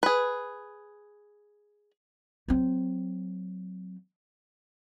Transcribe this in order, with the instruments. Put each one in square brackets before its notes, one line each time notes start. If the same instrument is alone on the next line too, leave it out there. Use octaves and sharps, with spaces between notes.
[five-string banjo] G#4 B4
[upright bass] F#3 C4